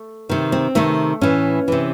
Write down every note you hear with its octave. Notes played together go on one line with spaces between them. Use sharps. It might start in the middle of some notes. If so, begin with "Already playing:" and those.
Already playing: A3
C3 D#3
C4
C3 D#3 A3
A2 E3 C#4
C3 E3